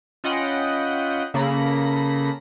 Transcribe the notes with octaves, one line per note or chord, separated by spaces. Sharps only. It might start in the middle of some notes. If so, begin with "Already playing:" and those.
C#4 F4 D#5 F#5 G5 B5
C#3 A#3 A4 B5 A#6